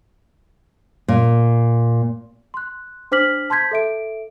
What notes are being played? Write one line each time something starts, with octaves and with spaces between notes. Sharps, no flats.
A#2
C6 F#6
D4 C5 D6 F6 B6 F#7
A5 C6 G6 G#6 B6
A4 E5 D7